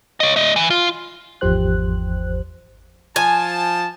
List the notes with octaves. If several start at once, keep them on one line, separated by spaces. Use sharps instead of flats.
C#5 D#5
A3 D#5
E3
F4
G#1 E2 F3 G4 C5 F#6
F3 G#5 A5